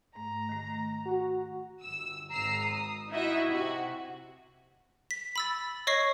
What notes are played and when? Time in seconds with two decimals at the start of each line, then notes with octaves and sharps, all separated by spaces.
0.15 G#2 A3 A#5
0.49 D#3 A3
1.06 F#4
1.82 G1 E6
2.29 G#1 A#5 E6 C7
2.64 D#6
3.10 D#4 E4 F#4 D#5 E5
3.47 C3 F#4
5.11 B6
5.36 B5 E6 A6
5.87 C#5 D#5 C#6 A#6 C7